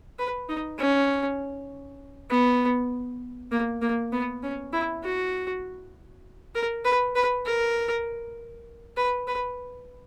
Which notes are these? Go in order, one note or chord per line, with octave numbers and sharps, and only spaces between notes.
B4
D#4
C#4
B3
A#3
A#3
B3
C#4
E4
F#4
A#4
B4
B4
A#4
B4
B4